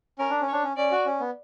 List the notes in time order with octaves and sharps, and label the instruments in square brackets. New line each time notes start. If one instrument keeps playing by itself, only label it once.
[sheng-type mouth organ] C#4 [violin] A#4
[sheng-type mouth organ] D4
C#4
[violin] C#5
[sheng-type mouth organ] D4
C#4
[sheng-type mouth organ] C#4 [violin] D5
[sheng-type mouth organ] F#4
C#4
B3